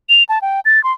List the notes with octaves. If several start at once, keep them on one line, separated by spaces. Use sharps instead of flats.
F7
A5
G5
A6
C6